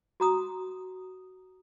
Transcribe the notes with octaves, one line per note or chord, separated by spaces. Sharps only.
F#4 A#5 D#6